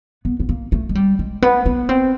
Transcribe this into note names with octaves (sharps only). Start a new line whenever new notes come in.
B3
B3
A#3
A3
G#3
G3
G#3
B3
B3
C4